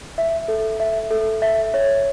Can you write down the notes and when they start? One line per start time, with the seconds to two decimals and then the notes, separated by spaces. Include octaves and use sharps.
0.18 E5
0.48 A4
0.80 E5
1.11 A4
1.42 E5
1.74 C#5